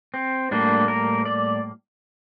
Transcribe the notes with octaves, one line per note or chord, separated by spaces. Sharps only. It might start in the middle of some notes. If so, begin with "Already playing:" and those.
C4
A2 G3 A#3 D4
A#4
D5